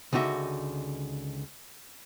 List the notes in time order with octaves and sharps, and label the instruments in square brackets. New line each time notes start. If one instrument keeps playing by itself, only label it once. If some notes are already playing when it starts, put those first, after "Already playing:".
[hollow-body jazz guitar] C#2 D3 D#4 F#4 E5